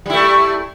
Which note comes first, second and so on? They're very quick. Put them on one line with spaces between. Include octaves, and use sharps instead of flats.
G3 E4 A3